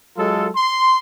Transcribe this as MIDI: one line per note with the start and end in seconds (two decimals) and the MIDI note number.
0.17 0.49 54
0.17 0.49 56
0.17 0.49 65
0.17 0.49 69
0.56 0.98 84